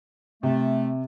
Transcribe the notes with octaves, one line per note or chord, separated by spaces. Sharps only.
C3 A3